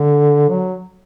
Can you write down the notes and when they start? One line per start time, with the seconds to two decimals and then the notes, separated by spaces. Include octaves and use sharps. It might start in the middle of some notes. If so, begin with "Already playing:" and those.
Already playing: D3
0.49 F#3